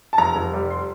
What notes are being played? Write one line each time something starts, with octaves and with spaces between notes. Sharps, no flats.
A5
F1 A#5
F1
G3
C6